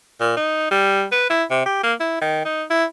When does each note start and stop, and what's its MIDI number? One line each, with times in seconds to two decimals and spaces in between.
0.21 0.33 46
0.37 0.69 63
0.71 1.04 55
1.12 1.26 71
1.30 1.44 64
1.50 1.64 48
1.66 1.79 67
1.83 1.93 58
2.00 2.17 64
2.21 2.42 51
2.45 2.63 63
2.70 2.85 64